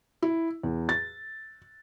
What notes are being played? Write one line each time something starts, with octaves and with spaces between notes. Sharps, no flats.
E4
E2
A6